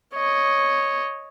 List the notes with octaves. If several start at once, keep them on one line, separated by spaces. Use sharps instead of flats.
C#5 D#5